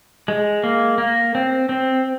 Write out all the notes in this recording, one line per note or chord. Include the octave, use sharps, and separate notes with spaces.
G#3
A#3
A#3
C4
C4